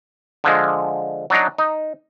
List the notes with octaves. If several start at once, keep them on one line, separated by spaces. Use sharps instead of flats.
D3 F3 G#3
F#3 D4 D#4 A#5
D#4